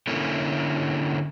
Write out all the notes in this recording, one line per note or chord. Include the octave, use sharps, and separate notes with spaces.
D3 A#3 C#4 E4 A4 A#4